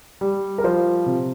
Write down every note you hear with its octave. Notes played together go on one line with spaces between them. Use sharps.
G3
A#4
F3 C5
C3